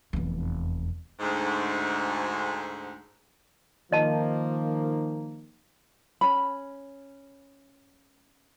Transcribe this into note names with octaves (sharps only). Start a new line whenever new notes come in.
F1 E2
D2 G#2
D#3 F3 A#3 D#5 A5
C#4 B5